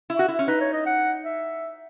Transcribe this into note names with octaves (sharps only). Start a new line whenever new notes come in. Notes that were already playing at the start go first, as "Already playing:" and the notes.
E4
F#4
E4
C#4
D#4 B4
C#5
D#5
F#5
E5